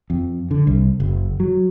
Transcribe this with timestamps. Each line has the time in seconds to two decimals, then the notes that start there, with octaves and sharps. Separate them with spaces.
0.10 F2
0.51 D3
0.67 C2
1.00 F#1
1.40 F#3